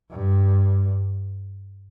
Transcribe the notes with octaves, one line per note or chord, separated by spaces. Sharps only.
G2